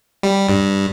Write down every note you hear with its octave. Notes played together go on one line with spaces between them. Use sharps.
G3
G2